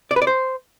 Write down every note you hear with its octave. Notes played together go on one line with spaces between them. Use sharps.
D5
B4
D5
C5